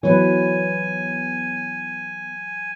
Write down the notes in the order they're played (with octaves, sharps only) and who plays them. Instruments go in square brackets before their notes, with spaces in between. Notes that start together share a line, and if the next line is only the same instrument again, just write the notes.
[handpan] E3 F#3 B4 [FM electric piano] B3 [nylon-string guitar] C#5 [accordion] G#5